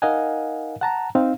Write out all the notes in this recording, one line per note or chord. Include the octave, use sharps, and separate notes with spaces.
D#4 A#4 D#5 F5 F#5 G#5
F#5 A5 A#5
C4 D#4 F5